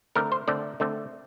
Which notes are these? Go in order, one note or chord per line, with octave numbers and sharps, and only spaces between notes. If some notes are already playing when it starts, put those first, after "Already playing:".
D3 A3 C4 A#4
C5
D3 A3 C4 D5
D3 A3 C4